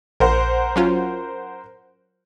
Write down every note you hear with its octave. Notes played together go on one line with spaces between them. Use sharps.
A#1 A#4 C5 F#5
F#3 C#4 F4